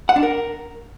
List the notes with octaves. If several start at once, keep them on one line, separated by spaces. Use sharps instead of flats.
F#5
D4
A#4